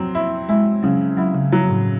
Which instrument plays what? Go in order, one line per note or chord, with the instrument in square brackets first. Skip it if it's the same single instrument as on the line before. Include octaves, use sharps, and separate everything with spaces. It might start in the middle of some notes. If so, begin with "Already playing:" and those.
Already playing: [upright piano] F#3 C4
E4
[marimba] G#3 [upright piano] E4
[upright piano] C#3 [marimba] F#3
[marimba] F#3 [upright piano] E4
[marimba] C#3
[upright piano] F#3
[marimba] A2